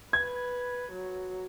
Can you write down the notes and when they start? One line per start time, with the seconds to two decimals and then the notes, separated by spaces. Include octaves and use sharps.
0.13 B4 G#6
0.92 F#3